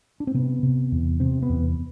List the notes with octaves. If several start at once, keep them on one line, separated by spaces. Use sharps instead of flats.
D4
C4
C3 B3
C3
E2
C3 C4
B3
E2